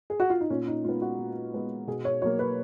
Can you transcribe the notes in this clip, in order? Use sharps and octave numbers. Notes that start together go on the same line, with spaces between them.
G#4
F#4
F4
D#4
A#2 C#4
D#4
G#3 B3 F4
F#4
A#2
G#3 B3
B2 G#4
C#5
F#3 A#3 C#5
B4